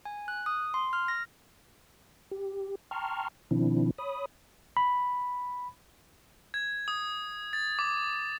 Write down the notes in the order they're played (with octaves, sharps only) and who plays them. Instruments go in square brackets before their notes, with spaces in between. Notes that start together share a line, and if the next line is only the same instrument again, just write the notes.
[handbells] G#5
F#6
D#6
C6
F6
A#6
[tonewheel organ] G4
G5 A5 A#5 C6 C#6 F6
B2 D#3 F3 C4 D4 E4
C#5 B5 D#6
[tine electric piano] B5
[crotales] G#6
D#6
A6
D6